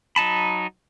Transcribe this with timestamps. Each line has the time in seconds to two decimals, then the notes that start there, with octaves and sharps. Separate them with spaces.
0.16 F#3 D#4 A5 B5